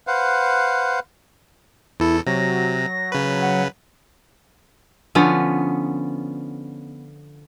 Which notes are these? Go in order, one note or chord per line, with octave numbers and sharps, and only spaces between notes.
B4 C5 F5 F#5
E2 E4 A4
C3 F#3 A#6
C#3 B4
F#5
D3 F3 B3 C#4